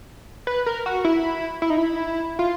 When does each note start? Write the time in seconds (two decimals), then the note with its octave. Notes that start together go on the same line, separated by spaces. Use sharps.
0.47 B4
0.66 A#4
0.86 F#4
1.05 E4
1.62 E4
1.70 D#4
1.78 E4
2.39 F4